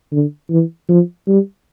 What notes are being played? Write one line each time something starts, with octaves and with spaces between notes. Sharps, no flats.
D3
E3
F3
G3